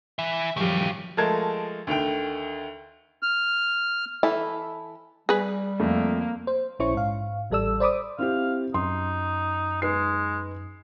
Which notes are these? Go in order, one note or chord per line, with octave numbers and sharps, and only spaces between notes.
E3 E5
F#2 D#3 F3 G3 A3 G4 F5
F3 G#3 A3 A#4 A5 G#6
D2 D3 D#3 G5
F6
E3 E4 A4
G3 G#4 B4
F2 A3 A#3
C5
A#1 C#4 E4 C5 C#5 C#6
G#2 F5
A1 G3 A4 D5 E6
C5 D5 B5 D6 D#6
C4 E4 G4 F5
F#2 D#4 C6
G#3 D#4 B4 C7